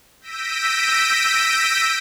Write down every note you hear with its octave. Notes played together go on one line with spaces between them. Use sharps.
E6 G6 A#6 B6 D7 D#7